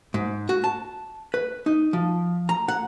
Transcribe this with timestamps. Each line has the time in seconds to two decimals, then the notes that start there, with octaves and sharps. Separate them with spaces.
0.14 G#2
0.49 F#4
0.64 A5
1.34 B4
1.66 D#4
1.93 F3
2.49 A#5
2.68 F#5